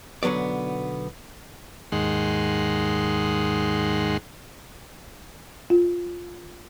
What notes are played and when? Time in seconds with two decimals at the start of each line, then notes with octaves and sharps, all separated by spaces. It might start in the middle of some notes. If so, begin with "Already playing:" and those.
0.23 B1 D3 F#3 B3 D5
1.92 D#2 G#2 D#3 G#3 F#5 C6
5.70 F4